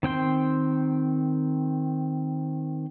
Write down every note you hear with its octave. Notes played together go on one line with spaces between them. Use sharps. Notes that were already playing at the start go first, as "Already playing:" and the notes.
D#3 C4 G5 C6